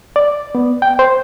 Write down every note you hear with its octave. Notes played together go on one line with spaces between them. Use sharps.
D5
B3
G5
C5